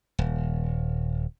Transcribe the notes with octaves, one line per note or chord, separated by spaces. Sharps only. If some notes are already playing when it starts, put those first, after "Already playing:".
D#1